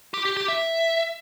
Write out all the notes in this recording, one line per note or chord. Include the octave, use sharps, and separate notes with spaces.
G4
G4
G4
E5